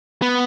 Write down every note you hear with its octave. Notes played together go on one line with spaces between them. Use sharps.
B3